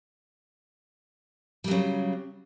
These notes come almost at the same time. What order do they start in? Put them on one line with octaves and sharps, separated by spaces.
G3 F#3 C#3